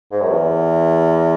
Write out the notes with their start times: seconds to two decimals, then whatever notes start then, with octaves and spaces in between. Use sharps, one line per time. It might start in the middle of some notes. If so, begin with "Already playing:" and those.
0.12 G#2
0.21 F#2
0.30 E2